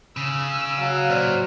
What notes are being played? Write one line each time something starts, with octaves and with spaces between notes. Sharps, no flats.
C#3 E6
F#3 F5
A#2 C5 D5 F6